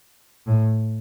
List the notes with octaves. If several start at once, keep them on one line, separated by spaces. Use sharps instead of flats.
A2